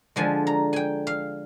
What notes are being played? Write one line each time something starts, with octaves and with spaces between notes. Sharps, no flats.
D3 F3 G#3 G#5
A#5
G5 G#5
F5